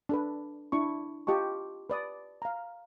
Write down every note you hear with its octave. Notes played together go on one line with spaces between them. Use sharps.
D4 A4 B4
D4 E4 C#6
F4 G4 D#5 A5 C#6
B4 D5 D#6
F5 A#5